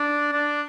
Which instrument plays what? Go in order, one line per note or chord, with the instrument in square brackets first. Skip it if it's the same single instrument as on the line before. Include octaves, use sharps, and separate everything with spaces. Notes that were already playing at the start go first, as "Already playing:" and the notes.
Already playing: [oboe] D4
D4